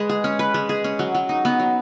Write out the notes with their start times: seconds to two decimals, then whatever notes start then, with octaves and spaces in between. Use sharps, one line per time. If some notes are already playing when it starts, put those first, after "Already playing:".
Already playing: G#3 B4
0.09 G#4
0.24 C#4
0.39 B4
0.54 G#3
0.69 G#4
0.84 C#4
0.99 F#3
1.15 F#3
1.29 D#4
1.45 B3
1.59 F#3